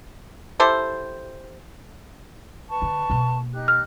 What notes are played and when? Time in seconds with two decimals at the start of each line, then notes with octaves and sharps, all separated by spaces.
0.60 E4 G4 A4 C5
2.70 B4 A5 C#6
2.82 D3
3.10 B2 A#3
3.53 D#4 G4 F#6
3.68 F6